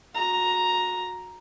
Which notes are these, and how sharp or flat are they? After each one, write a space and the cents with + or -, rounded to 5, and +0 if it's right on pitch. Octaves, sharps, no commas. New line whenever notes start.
F#4 -25 A#5 +5